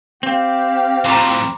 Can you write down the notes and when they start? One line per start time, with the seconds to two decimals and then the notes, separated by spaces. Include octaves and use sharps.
0.23 C4 G4 F5
1.05 F2 A2 A#5 C6 D6